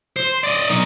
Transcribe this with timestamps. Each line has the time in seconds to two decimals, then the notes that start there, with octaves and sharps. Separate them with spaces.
0.16 C5
0.44 D5 D#5
0.70 B1 D#4